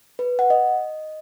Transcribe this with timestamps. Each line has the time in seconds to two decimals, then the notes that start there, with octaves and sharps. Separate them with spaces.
0.19 B4
0.39 F#5
0.50 D#5